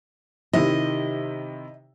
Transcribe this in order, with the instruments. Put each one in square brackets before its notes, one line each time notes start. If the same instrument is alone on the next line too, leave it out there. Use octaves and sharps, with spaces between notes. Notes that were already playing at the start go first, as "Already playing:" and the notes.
[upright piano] C3 D#3 E4 [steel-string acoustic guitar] D#5